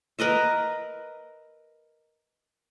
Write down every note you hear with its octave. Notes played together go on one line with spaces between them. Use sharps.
A#4 B4 D#5 E5